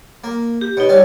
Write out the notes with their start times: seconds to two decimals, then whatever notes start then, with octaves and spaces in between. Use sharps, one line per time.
0.24 A#3
0.61 G4
0.77 B2 D#4 C#5
0.89 G3 C#4